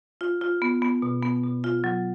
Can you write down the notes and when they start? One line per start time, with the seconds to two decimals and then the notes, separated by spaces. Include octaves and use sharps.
0.21 F4
0.41 F4
0.62 B3
0.82 B3
1.02 B2
1.23 B3
1.43 B2
1.64 F4
1.84 F#3